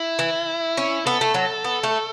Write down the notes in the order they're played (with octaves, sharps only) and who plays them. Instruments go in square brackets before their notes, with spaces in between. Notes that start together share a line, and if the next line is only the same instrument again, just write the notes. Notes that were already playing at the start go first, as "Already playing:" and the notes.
Already playing: [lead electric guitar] E4
[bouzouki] E3
C#4
[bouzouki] B3 [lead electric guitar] A4
[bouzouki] A3
F#3
B3
A3